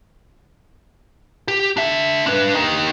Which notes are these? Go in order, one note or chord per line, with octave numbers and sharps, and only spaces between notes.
G4
D4 E5
D4 B4
D#4 G4